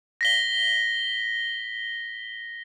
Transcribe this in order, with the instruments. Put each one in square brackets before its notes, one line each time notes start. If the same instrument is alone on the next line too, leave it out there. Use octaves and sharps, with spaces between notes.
[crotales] A#6 B6 G7